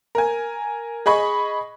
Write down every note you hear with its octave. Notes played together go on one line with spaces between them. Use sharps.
A#4 G#5
G#4 D#5 B5 C#6